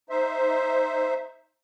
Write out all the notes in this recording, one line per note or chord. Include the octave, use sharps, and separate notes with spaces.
D#4 C5 E5